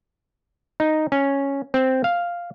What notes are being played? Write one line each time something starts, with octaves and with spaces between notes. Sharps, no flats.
D#4
C#4
C4
F5